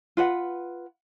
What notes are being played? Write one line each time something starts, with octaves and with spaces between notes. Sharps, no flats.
F4 B4 F#5